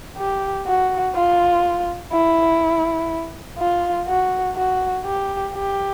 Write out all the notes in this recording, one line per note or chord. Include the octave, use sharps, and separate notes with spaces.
G4
F#4
F4
E4
F4
F#4
F#4
G4
G4